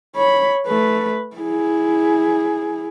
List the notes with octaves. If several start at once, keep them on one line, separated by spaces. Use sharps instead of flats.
C#5 B5
A3 B4
E4 G#4